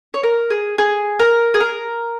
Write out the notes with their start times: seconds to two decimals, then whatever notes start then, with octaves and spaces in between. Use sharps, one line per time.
0.14 C#5
0.23 A#4
0.50 G#4
0.78 G#4
1.19 A#4
1.54 G#4
1.60 A#4